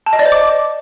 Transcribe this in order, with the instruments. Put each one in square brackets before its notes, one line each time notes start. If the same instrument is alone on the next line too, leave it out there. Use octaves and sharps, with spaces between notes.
[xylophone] A5
D#5
D5
C5
D6